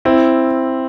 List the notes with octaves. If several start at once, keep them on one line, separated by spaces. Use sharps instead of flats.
C4 E4